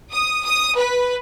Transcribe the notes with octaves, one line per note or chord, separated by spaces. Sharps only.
D#6
D#6
B4